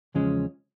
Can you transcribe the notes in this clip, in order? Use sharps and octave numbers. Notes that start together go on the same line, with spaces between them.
E2 C#3 F3 G#3 C#4